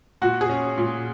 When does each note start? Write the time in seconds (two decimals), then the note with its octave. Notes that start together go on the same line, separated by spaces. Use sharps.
0.22 A#2 F#4
0.41 G#4
0.49 C#4
0.78 A#2